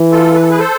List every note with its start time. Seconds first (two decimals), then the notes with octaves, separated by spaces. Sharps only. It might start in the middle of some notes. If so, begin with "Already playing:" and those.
Already playing: E3
0.11 F4 A4
0.35 B4
0.42 A4
0.49 G#4 B4
0.58 A4 C5